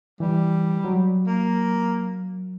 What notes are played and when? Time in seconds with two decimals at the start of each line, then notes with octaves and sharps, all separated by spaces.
0.20 E3 G3
0.85 F#3
1.26 A#3